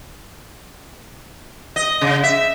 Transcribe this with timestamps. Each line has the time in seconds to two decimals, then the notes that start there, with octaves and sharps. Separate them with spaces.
1.76 D#5
2.01 C#3
2.24 E5